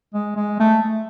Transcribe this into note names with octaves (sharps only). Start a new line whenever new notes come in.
G#3
G#3
A3